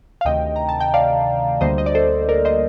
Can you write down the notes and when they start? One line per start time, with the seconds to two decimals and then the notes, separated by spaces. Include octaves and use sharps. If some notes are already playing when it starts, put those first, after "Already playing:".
0.21 F5
0.25 D2 C3 D#3 A3 D#5 G5
0.56 A#5
0.69 A5
0.80 G5
0.94 D5 F5
1.61 D2 D3 G3 A#3 C5 D#5
1.78 D#5
1.86 D5
1.95 A4 C5
2.29 A#4 D5
2.45 C5 D#5